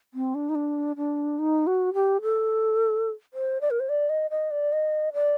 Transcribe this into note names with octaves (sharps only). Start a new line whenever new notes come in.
C4
D4
D#4
D4
D4
D#4
F#4
G4
A4
C5
D5
A#4
C5
D5
D#5
D#5
D5
D#5
D5